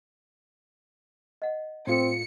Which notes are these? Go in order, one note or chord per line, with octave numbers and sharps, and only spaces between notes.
D#5 F#5
A2 C4 F4 A4 D5 C#7